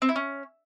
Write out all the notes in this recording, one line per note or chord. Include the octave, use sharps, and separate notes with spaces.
C4
E4
C#4